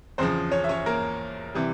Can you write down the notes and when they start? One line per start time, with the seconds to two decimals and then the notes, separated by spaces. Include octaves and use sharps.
0.18 E2 C#3 F3 C4 C5
0.52 C#4 C#5
0.64 E5
0.69 C#4 C#5
0.86 A#3 A#4
1.55 C3 E3 G3